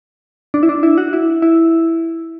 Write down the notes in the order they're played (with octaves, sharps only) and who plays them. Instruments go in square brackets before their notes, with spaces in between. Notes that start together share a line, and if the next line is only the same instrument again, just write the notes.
[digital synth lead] D4
E4
D4
E4
F#4
E4
E4